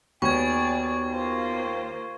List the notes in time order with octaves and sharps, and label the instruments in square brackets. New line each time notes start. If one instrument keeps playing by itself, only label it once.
[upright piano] D#2 [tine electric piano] B3 F#4 B5 [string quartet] G#4 D5 [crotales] C#6 G#6
[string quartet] A#3 F4 C5